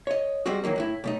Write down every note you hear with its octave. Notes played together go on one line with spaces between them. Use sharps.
C#5 D#5
G3 G#3 C4 F#4
D#3 E3 F#3 A#3
A2 A3 E4
B1 A3 D#4